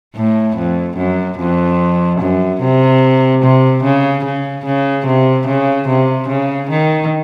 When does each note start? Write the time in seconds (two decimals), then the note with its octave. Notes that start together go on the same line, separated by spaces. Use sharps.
0.15 A2
0.56 F2
0.97 F#2
1.38 F2
2.20 F#2
2.61 C3
3.42 C3
3.83 C#3
4.24 C#3
4.65 C#3
5.06 C3
5.47 C#3
5.88 C3
6.28 C#3
6.69 D#3